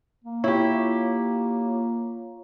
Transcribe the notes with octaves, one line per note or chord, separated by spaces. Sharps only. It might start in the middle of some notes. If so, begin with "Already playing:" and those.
A#3
E4 F4 G4 C#5